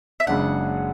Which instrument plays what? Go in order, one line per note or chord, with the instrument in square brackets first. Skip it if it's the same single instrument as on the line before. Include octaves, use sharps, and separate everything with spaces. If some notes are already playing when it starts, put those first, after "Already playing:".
[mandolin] E5
[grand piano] F#1 F#2 C#3 G#3 D4 [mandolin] F#5